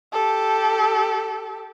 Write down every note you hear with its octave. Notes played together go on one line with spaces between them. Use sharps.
G4 A4